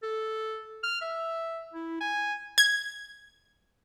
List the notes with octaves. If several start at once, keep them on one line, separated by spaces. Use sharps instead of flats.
A4
F6
E5
E4
G#5
G#6